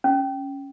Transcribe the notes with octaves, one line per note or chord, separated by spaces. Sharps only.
C#4